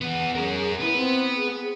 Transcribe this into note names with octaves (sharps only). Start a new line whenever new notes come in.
E2 B3 F#5
C#4 G#4 A#4
B3 E4 B4
C4
G#4